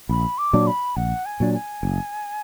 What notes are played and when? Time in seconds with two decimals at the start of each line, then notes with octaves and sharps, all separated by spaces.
0.09 A#1 B5
0.38 D6
0.53 A#2 F#3 D4
0.67 B5
0.96 A#1 F#5
1.26 G#5
1.40 A#2 F#3 D4
1.54 G#5
1.83 F#1